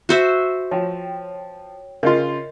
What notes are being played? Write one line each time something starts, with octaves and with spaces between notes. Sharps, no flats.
F#4 C5 E5
F3 C#5 G5
C#3 F4 A#4 D#5 C6